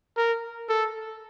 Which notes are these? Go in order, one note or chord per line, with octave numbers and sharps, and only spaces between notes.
A#4
A4